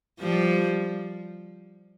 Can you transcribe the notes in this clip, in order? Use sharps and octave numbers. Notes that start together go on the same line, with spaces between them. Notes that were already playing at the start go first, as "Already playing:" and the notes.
F3 G3